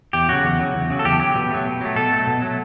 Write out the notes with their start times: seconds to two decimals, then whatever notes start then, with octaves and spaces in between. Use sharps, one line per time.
0.13 E2 G4
0.29 C#3 F#3 F#4
0.45 E2
0.59 C#3 F#3
0.74 E2
0.90 C#3 F#3
0.99 A4
1.05 E2 G4
1.20 C#3 F#3 G4
1.35 B2
1.51 F#3 A3
1.66 B2
1.81 F#3 A3
1.96 B2 A4
2.12 F#3 A3
2.27 B2
2.42 F#3 A3